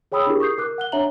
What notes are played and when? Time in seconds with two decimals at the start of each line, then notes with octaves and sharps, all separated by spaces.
0.12 G#4 C#5 G5 B5 D#6 E6
0.26 D4 E4 F4 G4 G#4 A#4
0.40 C#6 D#6 G6 C7
0.58 A#4 D6 F#6
0.78 F#5 F#6 G7
0.92 D4 C#5 E5 A#5 F#7